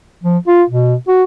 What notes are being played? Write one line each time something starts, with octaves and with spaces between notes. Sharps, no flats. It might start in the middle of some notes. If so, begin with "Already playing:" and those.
F3
F4
B2
F#4